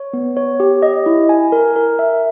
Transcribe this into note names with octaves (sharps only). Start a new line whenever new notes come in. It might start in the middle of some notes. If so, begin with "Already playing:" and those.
Already playing: C#5
B3
C#5
G4
D#5
E4
G#5
A#4
A#4
E5